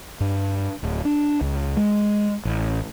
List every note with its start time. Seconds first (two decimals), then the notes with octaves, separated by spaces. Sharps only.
0.20 G2
0.83 D1
1.05 D4
1.41 C#2
1.77 G#3
2.45 A1